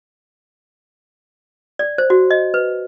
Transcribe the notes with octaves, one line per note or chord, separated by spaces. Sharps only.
D5
C5
F#4
D#5
B4